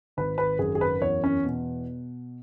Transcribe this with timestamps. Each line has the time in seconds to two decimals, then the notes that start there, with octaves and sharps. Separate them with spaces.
0.17 G#1 B4
0.38 B4
0.59 F#2 G#4
0.75 G#4
0.81 B4
1.01 E2 C#5
1.24 C#4
1.45 B2